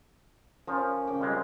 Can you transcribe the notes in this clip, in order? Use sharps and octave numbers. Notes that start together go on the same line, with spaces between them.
F3 C#4 A#4
C#3 G5 D6
F2 G3 G#3